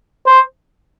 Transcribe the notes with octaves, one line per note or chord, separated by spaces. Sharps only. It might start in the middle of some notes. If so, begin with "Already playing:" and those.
C5